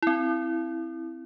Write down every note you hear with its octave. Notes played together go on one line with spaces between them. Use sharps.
C4 E4